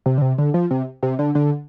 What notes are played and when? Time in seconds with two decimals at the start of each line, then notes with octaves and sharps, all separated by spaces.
0.06 C3
0.18 D3
0.22 C3
0.38 D3
0.54 F3
0.71 C3
1.03 C3
1.19 D3
1.35 D3